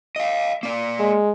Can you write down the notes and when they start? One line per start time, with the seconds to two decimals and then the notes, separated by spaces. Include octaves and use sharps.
0.16 D#5 F5
0.63 A#3 D5
1.00 G#3